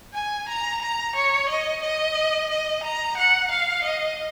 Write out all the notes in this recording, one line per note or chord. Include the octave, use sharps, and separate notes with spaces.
G#5
A#5
A#5
C#5
D#5
D#5
D#5
A#5
F#5
F5
D#5